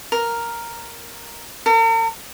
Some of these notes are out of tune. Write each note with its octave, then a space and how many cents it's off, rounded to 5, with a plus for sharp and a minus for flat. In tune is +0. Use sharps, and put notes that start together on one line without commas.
A#4 +0
A#4 -45